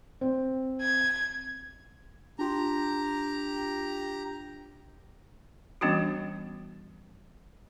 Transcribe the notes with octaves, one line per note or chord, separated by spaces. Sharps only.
C4
G#6
D4 F4 G4 A#5
E3 G3 B3 C#4 D4 F#4